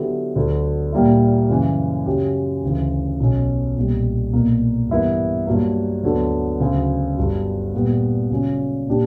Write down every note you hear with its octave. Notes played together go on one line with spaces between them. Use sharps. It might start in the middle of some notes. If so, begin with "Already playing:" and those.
Already playing: D3 F#3 B3 E4 G4
D2 D3 F#3
A#2 G3 A#3 E4
F#2 C#3 E3
F#2 C#3 F#3 C#4 G4
D2 C#3 E3
B1 B2 F#3 C#4
B1 A#2 G3
B1 A#2 A#3
G2 E3 B3 E4 A#4
G2 F#3 A#3
D2 D3 F#3 B3 D4
D2 C#3 F#3
G1 G2 D3 F#3
A#2 G3 B3
C#3 F#3 C#4
A#2 A#3 D4 G4